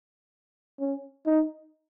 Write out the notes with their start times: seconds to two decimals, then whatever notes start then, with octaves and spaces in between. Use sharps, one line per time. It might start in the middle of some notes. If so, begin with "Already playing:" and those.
0.79 C#4
1.26 D#4